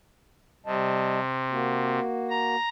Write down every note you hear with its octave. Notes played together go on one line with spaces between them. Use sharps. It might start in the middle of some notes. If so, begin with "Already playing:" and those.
C3 G3 D#5 A5
A#3 F#4
A#5